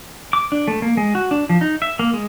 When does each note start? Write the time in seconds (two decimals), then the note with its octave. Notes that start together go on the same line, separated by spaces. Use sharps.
0.33 D6
0.52 D4
0.68 A3
0.82 A#3
0.97 G#3
1.15 F#4
1.31 D4
1.49 F3
1.61 D#4
1.82 E5
1.99 A#3
2.13 G#3